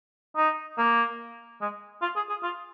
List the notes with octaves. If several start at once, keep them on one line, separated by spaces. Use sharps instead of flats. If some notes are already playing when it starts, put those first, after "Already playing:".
D#4
A#3
G#3
F4
G#4
G#4
F4